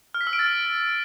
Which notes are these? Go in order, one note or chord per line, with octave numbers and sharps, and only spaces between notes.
F6
B6
E6
D7
A6